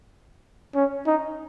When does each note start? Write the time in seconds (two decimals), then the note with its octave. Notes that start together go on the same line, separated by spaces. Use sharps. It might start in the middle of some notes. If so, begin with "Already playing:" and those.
0.75 C#4
1.07 D#4